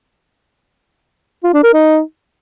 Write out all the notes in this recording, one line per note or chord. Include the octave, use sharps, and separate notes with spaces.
F4
D4
A#4
D#4